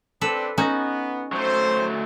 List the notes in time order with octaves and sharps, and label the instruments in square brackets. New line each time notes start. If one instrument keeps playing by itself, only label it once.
[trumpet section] C4 D4 [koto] A4 B4
[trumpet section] B3 [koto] C#4 D#4 F#4
[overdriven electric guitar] F#3 A3 [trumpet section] C5